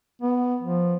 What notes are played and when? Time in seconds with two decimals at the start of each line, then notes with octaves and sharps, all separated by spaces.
0.21 B3
0.62 F3